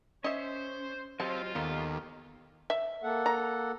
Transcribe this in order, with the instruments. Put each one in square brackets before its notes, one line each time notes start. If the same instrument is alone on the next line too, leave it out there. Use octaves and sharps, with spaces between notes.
[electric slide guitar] C#4 [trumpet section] C5 [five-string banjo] D#5 E5
[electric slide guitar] F#3 G4 D#5 [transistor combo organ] C4 [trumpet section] F4 [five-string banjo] A5
[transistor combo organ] D#2 [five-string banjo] A#3 D#4 [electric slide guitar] B3 G4 A4
[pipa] E5
[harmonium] A#3 A4 F#5
[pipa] A#5